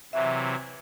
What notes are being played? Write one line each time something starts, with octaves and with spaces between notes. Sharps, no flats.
C3 E3 F#3 E5